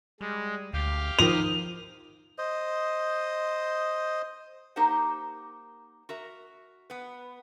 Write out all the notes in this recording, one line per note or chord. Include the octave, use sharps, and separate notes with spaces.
G3 G#3
D2 G4 F5
D#3 F3 A#4 D#6 F7
C5 D#5
A#3 D#4 G4 A#4 C5 F#5
F#4 A#4 E5
B3 B4